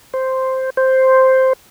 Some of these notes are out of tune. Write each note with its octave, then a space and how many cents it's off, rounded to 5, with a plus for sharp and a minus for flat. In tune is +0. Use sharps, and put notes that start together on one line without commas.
C5 +0
C5 +0